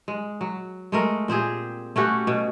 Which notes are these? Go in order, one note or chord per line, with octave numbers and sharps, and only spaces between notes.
G#3
F#3
G#3 A3 A#4
A#2 C4 G4 G#4
A3 C#4 F#4 G4
B2